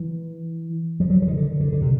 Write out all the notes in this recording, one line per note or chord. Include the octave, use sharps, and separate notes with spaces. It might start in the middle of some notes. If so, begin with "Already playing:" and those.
Already playing: E3
F3
F#3
E3
D#3
D3
D3
D3
C3